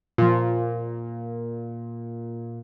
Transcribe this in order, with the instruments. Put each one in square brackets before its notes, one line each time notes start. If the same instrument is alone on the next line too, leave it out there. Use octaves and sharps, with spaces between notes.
[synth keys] A#2 [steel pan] F3 F4